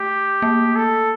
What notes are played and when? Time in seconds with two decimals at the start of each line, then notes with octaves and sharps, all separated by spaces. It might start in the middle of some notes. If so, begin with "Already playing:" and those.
Already playing: A3 G4
0.42 A#3
0.76 A4